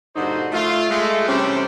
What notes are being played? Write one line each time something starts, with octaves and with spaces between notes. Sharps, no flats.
G2 A#2 D3 D#4 F#4 C5
A3 F4
G#3 A3
C3 E3 G3 C#4 D4 C5